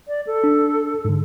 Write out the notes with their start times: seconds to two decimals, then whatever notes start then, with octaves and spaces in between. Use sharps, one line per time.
0.08 D5
0.27 A4
0.44 D4
1.05 G#2 D3